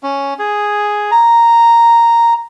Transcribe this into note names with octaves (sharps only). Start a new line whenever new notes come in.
C#4
G#4
A#5